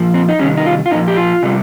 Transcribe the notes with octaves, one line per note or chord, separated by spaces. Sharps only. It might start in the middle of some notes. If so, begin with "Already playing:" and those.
Already playing: A#2 F3
C4
D#4
C3 D#3 G3 C#4
D#4
F4
F4
A#2 F3 D#4
G4
F4
C3 G3